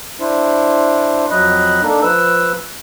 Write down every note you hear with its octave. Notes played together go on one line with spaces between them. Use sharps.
D4 E4 C5
F2 F#3 D#5 B5 F#6
A#3 D4 D#4 A4
F3 B4 E6